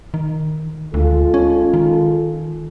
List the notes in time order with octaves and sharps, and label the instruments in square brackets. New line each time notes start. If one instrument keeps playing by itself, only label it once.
[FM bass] D#3
[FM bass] D2 [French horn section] G#3 F4 A4
[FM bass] C#4
D#3